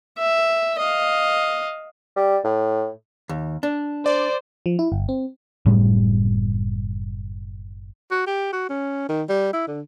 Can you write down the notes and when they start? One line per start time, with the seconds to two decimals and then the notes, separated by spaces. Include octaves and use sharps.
0.18 E5
0.79 D#5 F5
2.16 G3
2.44 A2
3.29 D#2
3.63 D4
4.06 C5 D5
4.66 F3
4.79 E4
4.92 G1
5.09 C4
5.66 F#1 A2 G3
8.11 F#4
8.27 G4
8.53 F#4
8.69 C#4
9.09 D#3
9.29 G3
9.53 E4
9.67 D3